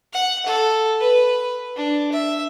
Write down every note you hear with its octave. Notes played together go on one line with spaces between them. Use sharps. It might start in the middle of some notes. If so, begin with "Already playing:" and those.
F#5
A4
B4
D4
E5